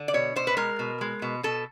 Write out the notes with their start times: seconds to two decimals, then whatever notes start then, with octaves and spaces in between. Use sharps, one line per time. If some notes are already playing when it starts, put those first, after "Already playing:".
Already playing: D3
0.08 D5
0.14 B2 C#5
0.36 B2 C5
0.47 B4
0.57 G#3 A#4
0.79 B2
1.01 G#3
1.22 B2
1.43 B2 A4